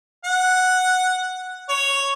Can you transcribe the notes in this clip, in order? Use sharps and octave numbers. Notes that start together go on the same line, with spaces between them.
F#5
C#5